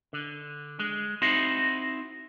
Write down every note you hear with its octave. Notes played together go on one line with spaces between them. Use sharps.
D3
G#3
C4 D#4 E4 F#4 C5